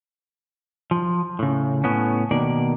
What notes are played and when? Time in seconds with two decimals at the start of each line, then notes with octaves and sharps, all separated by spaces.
0.91 F3
1.39 A2 C#3
1.84 A2 B3 C#4
2.31 B2 D#3 A#3 D5